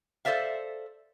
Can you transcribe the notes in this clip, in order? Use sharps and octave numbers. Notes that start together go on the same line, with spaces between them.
A4 C5 D5 E5 F5